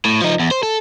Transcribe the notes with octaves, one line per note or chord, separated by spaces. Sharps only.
A2
F3 D#4
E2
C5
A4